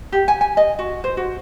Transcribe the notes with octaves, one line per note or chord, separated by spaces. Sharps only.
G4
G#5
G#5
D#5
F#4
C5
F#4